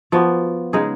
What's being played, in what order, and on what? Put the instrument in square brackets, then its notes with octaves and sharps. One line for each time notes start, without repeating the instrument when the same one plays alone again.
[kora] F3 B3 F#4
C#3 G#3 D#4 G#4